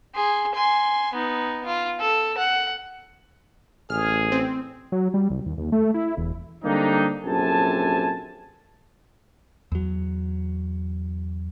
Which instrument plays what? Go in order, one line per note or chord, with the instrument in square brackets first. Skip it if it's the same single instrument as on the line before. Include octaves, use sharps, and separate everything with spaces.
[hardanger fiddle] G#4 C6
G#5 C6
B3 D#4
F4
A4
F#5
[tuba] A1 [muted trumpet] G#4 [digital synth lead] F6
[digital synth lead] C4
[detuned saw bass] F#3
G3
C2
D#2
D#2
A3
E4
E1
[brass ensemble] D3 G3 A#3 C4 D4 D#4
A#1 F#2 C3 A4 G#5 A5
[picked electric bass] E2 F#3